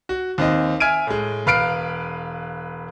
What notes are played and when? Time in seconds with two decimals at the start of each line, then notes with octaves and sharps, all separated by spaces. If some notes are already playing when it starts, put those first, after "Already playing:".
0.09 F#4
0.38 D#2 C4 D#5
0.80 E5 G#5 F6 G#6 D7 D#7
1.07 A2 G#3
1.46 E1 B4 F5 F6 C7 D7